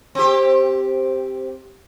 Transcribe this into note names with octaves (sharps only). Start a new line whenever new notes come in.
C4 G4